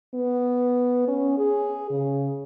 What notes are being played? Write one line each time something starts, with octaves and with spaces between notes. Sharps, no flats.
B3
C#4
G#4
C#3